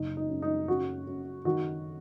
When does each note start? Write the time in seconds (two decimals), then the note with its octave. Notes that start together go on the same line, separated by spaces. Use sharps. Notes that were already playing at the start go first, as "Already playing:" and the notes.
Already playing: F#1 D#4
0.17 D#4
0.29 F#2
0.42 D#4
0.68 C#3 F#4
1.07 F#2
1.45 D#3 F#4